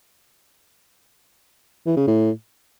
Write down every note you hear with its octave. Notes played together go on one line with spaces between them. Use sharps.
E3
C#3
A2